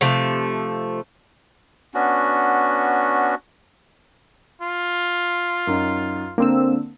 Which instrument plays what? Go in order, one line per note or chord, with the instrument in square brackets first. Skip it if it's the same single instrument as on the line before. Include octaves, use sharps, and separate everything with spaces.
[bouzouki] C3 F3 A3
[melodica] B3 C#4 D4 F#4
[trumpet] F4
[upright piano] F#2 D#4
[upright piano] D3 [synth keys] A#3 C4 E6